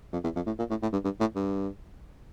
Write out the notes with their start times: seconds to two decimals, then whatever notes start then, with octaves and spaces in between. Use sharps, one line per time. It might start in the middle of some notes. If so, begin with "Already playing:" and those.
0.13 F2
0.24 E2
0.35 F2
0.46 A2
0.59 A#2
0.70 A2
0.82 A2
0.92 G2
1.04 G2
1.20 A2
1.35 G2